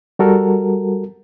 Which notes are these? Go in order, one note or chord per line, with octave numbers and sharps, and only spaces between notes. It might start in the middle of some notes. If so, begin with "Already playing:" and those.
G3 F#4 A4 A#4